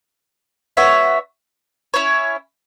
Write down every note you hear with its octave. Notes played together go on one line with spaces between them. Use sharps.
B3 F#4 C#5 E5
C#4 E4 C#5